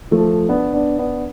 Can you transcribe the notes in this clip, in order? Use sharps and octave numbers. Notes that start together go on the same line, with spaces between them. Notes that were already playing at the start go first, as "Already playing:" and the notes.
F3 A3
B3 D4
B3 D4
B3 D4